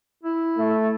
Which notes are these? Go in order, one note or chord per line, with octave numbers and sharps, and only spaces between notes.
E4
A3